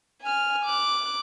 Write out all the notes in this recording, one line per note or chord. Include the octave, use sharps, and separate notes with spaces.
G#5 F6
D6 F#6